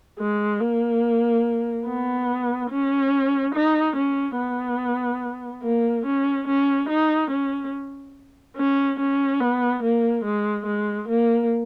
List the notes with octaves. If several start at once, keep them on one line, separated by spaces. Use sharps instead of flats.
G#3
A#3
B3
C#4
D#4
C#4
B3
A#3
C#4
C#4
D#4
C#4
C#4
C#4
B3
A#3
G#3
G#3
A#3